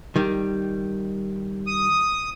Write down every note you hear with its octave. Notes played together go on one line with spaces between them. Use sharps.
D#3 G3
D#6